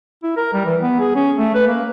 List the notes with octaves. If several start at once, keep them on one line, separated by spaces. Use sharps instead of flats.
E4
A#4
G3
E3
B3
G#4
C#4
A3
B4
A#3